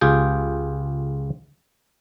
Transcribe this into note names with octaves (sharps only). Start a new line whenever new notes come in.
C#2 F4 G4 G#4 G5